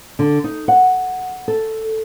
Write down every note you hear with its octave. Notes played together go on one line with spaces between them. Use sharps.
D3
D#4
F#5
A4